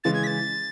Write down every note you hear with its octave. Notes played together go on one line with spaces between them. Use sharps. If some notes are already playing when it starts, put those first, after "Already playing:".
C#3 E3 G#3 A6
G#6
B6
A6